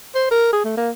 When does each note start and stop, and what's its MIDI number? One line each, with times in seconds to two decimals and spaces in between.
0.15 0.30 72
0.31 0.50 70
0.53 0.63 68
0.65 0.76 57
0.78 0.90 58